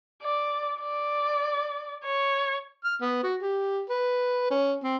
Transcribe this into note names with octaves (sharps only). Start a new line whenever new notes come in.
D5
D5
C#5
F6
B3
F#4
G4
B4
C#4
C4